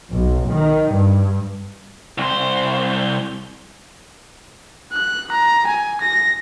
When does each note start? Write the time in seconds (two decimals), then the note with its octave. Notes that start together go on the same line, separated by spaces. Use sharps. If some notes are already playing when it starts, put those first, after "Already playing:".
0.11 B1
0.51 D#3
0.93 G2
2.18 C2 C5
4.93 F#6
5.32 A#5
5.67 G#5
6.01 A#6